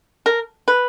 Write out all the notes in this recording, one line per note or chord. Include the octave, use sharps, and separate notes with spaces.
A#4
B4